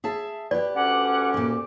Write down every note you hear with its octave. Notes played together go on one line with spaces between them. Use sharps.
G#4 E5 A5
G4 B4 D5
D2 C#4 F#5 D6
A#2 G4